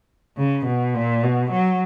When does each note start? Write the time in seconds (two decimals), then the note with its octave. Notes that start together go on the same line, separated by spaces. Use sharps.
0.37 C#3
0.66 B2
0.94 A#2
1.23 B2
1.51 F#3